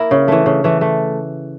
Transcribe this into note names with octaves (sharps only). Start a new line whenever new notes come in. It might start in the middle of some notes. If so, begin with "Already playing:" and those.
Already playing: A#3 E4 A#4
C#3
E3 A3
C#3
E3 A3
A3